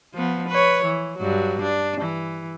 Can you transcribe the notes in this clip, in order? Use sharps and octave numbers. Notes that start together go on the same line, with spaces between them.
F3 B3
B4 C#5
E3
G2 F#3
D4
E3